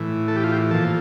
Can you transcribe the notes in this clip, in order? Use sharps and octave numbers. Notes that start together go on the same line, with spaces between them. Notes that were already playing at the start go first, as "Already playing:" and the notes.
Already playing: A2 E3
A4
G4
F4
G4
A#2 F3 A4